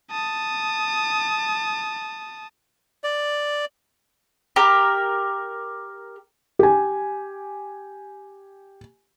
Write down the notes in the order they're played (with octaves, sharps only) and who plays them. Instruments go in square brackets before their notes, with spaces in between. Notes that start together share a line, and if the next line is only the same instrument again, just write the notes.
[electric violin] A5 D#6
[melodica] D5
[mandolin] G4 A#4
[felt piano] G4 G#5